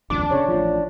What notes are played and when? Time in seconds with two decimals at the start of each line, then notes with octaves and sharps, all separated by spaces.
0.10 D1 A1 F2 D4 D6
0.31 C#3 C#5
0.48 A1 F3